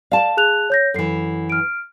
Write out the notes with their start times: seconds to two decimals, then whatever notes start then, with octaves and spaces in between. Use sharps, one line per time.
0.12 D5 F5 A5
0.37 G#4 F#6 F7
0.70 C#5 G6 A#6
0.94 F#2 E3 A4 C7
1.50 F6 D7